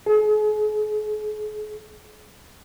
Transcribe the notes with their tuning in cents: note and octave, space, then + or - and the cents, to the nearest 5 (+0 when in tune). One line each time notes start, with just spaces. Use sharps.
G#4 +40